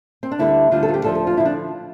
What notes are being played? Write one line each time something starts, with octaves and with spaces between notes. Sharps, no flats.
C4
D4
D2 D3 G3 E4
D2 D3 G3 F4
A4
F4
G4
D2 D3 F3 A4
A4
F4
D3 F3 E4
D4